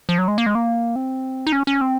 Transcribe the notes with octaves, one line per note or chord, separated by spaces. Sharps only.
F3
F#3
G#3
A#3
G#3
A#3
C4
D#4
C#4
C#4
C4